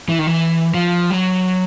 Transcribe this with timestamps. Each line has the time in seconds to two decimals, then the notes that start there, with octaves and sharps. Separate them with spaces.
0.09 E3
0.19 D#3
0.27 E3
0.74 F3
1.11 F#3